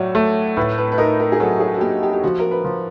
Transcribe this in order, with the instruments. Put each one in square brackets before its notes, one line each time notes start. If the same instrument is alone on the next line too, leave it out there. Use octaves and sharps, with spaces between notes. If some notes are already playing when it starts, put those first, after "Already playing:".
Already playing: [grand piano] A2 F#3 [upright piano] C#5 D5
[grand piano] A3
[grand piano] A2 [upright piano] B4
[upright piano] B4
B4
[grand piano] D#4 [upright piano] A#4
[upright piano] A#4
G#4
[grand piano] F#3 [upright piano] A4
[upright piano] G#4
F#4
[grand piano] A#3 [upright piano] G4
[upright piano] G4
G4
[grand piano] F3 [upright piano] F#4
[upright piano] A#4
B4
[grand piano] F3